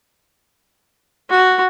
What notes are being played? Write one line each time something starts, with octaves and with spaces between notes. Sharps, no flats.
F#4